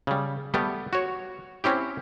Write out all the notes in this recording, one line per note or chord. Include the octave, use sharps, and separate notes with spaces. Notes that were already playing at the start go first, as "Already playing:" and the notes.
C#3 G3
G3 A3 B3 G4
F#4 C#5
C4 C#4 E4 G4